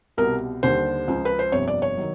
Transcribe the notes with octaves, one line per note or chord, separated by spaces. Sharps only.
C2 B2 G3 A#4
D#2 D3 G3 C5
C#2 C#3 F3
B4
C5
G1 F2 C3 C#5
D5
C#5
D#3 F#3